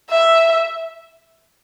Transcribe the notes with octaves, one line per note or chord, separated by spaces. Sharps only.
E5